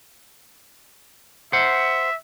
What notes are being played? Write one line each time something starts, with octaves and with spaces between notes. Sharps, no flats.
C5 E5 F#5